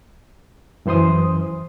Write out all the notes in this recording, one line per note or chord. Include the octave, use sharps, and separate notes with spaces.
F#2 E3 C5 C6 D#6